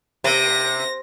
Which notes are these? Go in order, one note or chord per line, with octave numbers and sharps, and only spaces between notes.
C3 A#6